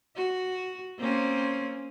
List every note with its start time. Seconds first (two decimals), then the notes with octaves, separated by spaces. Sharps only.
0.16 F#4
0.98 A#3 C4 C#4